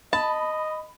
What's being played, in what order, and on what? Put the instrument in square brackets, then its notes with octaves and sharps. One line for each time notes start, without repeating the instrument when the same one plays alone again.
[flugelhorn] D#5 [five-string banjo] A5 [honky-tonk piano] B5